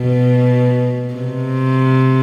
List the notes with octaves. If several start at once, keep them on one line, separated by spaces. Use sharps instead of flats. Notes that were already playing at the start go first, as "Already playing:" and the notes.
Already playing: B2
C3